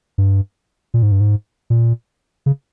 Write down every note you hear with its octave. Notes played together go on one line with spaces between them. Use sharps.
G2
A#2
G#2
G2
G#2
A#2
C#3